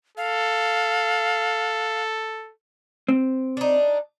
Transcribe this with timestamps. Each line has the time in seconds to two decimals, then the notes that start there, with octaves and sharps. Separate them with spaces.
0.17 A4 F5
3.08 C4
3.57 D4 D#4